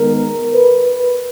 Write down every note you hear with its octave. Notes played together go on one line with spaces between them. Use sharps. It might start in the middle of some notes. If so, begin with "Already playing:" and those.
Already playing: D#3 G#3 B3 A#4
B4